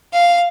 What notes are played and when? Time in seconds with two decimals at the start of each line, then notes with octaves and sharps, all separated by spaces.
0.12 F5